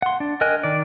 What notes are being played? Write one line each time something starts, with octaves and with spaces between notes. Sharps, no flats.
F#5 C6
D4
A#4 D#5 G5 G#5 F#6
D#3 D5